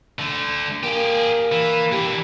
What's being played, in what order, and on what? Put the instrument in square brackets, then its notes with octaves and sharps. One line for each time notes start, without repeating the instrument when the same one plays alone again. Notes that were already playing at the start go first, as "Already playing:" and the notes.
[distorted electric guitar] D3 A3
[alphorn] A#3 [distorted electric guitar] G4 G#4
[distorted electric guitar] E3
[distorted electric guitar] E3 D4 [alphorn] G4